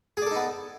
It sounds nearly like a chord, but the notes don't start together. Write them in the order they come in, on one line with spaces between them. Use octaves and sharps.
G#4 D5 A4 D#4 B3